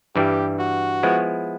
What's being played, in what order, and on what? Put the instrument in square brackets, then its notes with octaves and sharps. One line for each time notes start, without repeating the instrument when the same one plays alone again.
[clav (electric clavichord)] G2 E3 G3 [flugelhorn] G4
[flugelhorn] F#4
[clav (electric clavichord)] F3 G#3 B3 E4